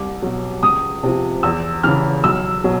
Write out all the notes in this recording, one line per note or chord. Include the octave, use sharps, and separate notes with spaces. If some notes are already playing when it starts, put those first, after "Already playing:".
Already playing: C2 D6
B2 F#3
C#2 D#6
C3 F3
E2 E6
C#3 E3 F6
B1 E6
B2 F#3